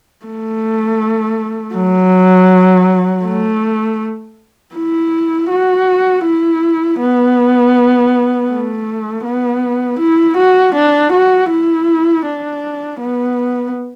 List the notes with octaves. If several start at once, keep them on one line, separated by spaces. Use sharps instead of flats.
A3
F#3
A3
E4
F#4
E4
B3
A3
B3
E4
F#4
D4
F#4
E4
D4
B3